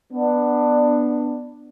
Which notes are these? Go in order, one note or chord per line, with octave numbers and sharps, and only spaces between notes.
B3 D4